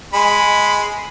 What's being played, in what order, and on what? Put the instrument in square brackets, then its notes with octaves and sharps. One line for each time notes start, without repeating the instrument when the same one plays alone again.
[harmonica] G#3 B5